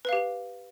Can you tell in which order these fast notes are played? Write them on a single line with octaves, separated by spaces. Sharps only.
B4 F5 G4